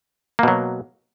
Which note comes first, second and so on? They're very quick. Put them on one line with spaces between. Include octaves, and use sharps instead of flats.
A#3 B2 F#3